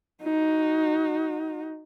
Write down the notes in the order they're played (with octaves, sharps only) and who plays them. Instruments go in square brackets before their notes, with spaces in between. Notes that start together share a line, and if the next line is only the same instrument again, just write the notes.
[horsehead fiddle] D#4 F#4